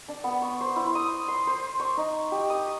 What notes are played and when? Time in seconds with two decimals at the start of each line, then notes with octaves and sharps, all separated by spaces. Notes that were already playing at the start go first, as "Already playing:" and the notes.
0.08 D4
0.24 B3
0.42 C#6
0.61 C5
0.76 E4
0.95 D#6
1.28 C6
1.47 C5
1.80 C#6
1.97 D#4
2.32 G4
2.50 D#6